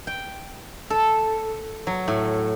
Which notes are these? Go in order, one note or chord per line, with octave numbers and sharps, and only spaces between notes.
G5
A4
F#3
A2